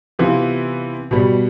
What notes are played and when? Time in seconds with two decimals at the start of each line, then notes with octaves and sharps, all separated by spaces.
0.19 C3 E3 B3 F4
1.11 B2 G3 B3